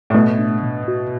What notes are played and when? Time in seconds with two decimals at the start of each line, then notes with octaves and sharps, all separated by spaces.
0.10 A2
0.14 B2 A3
0.39 D4
0.63 B2
0.88 F#4